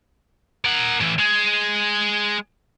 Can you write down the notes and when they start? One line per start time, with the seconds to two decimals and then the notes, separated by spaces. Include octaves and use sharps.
0.65 A#4 F#5
1.01 A2 E3
1.19 G#3 G#4